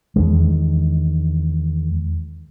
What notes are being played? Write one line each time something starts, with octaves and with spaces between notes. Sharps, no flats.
E2 D#3 G#3